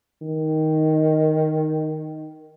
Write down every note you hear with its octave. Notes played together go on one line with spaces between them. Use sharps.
D#3